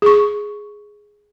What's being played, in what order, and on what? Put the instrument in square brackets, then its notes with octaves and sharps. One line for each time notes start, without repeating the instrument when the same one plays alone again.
[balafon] G#4 C#6